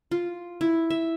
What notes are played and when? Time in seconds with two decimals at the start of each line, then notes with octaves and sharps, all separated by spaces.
0.11 F4
0.61 E4
0.90 E5